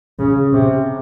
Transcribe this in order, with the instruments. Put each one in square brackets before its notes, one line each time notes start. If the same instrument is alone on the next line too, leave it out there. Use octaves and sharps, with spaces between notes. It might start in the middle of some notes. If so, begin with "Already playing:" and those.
[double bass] C#3
C3